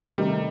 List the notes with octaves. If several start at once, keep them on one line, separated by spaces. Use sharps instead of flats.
C3 D#3 G3 A3 D#4